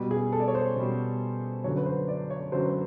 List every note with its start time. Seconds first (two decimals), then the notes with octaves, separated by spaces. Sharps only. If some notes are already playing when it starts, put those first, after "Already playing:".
Already playing: B2 G3
0.11 G#4
0.32 A4
0.40 D5
0.48 C#5
0.55 C5
0.76 B2 G3
1.64 F#2 D3 F#3 C#5
1.77 B4
1.86 C5
2.08 D5
2.30 C#5
2.52 F#2 D3 F#3 C5
2.65 B4